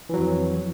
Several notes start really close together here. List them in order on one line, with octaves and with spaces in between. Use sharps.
E3 F#3 F2